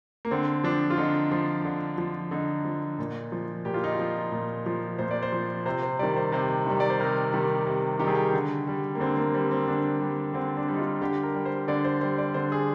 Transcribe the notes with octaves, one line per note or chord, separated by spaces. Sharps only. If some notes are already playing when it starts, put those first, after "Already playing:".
A#3
D3 C4
F3 D4
F4
D3 D#4
F3
D3
F3
D3 D#4
F3
A#2
F3
A#2 G4
F4
D#4
F4
F3
A#2
F3
A#2 C5
D5
C5
F3
C3 C5
C5
D#3 G3 D5
C5
C3 C5
D#3 G3
D5
C5
C3 A#4
D#3 G3
C3
D#3 G3 G4 G#4
G4
D3
G3
A#3
D3 C4
A#3
G3 C4
C4
D3 D4
G3
D3 C4
D4
G3
D#4
F4
D3 G4
A#4
G3
C5
D3 D5
C5
G3 C5
D5
D3 C5
G#4